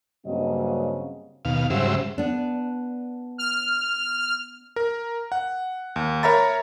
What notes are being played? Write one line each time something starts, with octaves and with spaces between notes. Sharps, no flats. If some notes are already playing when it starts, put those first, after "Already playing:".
G2 C#3 F#3 A#3 C4 D#5
D#2 B2 F5
G#2 C#3 F#3 G3 C5 E5
B3 D4
F6
A#4
F#5
D#2
A#4 C#5 E5 A#5 B5 A6